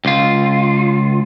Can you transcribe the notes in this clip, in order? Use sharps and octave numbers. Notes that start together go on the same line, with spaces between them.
C#2 F4